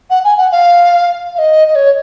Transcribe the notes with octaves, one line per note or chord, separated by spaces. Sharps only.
F#5
G#5
F#5
F5
F5
D#5
D#5
C#5